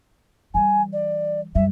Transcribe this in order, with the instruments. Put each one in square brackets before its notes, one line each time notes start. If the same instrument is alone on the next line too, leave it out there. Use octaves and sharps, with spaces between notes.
[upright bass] E3 G3 [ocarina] G#5
[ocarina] D5
[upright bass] F#2 G3 [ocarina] E5